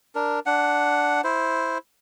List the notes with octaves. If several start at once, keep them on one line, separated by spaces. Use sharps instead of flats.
D4 A#4
D4 F#5
E4 C5